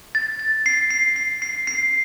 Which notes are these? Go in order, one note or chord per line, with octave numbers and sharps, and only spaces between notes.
A6
A6
C7
C7
C7
C7
C7